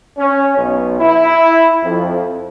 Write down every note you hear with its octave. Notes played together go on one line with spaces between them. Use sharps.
C#4
B1
E4
F2